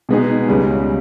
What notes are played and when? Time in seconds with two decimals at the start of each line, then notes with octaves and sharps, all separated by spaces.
0.09 B2 G#3 B3 D#4 G#4
0.48 C#2 C#3 G3